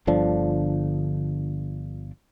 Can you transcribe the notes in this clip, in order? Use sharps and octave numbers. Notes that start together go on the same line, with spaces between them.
G1 D3 F3 D4